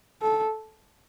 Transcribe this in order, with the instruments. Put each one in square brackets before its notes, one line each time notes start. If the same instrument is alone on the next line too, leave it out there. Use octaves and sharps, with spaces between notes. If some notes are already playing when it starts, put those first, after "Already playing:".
[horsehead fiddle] A4